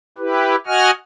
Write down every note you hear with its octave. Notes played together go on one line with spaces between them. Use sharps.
E4 G4 B4
F#4 D#5 F#5 G#5 F6